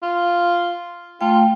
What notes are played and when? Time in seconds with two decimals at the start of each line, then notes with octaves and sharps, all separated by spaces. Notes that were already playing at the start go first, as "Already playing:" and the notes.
0.03 F4
1.21 A3 F4 G5